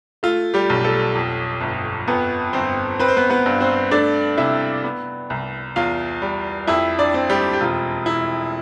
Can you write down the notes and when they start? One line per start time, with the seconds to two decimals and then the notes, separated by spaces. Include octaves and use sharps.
0.23 A3 F4
0.54 G3 G4
0.70 B1
0.84 A3 A4
1.15 F2
1.61 G1
2.08 F2 B3 B4
2.53 G1 C4 C5
2.99 C4 B4
3.08 C5
3.17 B3 B4
3.30 B3 B4
3.46 G2
3.61 C4 C5
3.91 A3 D4 D5
4.37 C3 E4 E5
4.84 B3
5.30 C2
5.76 E2 F4 F5
6.22 G3
6.67 F2 E4 E5
6.98 D4 D5
7.14 C4
7.30 G3 G4
7.53 G4
7.61 E1 F4
8.06 E1 E4